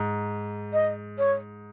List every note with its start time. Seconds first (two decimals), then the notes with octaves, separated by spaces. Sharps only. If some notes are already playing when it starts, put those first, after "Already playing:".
Already playing: G#2
0.73 D#5
1.18 C#5